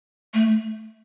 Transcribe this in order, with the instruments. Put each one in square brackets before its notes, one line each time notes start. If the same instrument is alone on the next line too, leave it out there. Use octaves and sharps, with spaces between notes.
[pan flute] A3